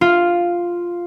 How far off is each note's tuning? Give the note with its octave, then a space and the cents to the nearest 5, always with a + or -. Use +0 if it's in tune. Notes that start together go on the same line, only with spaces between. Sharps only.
F4 +0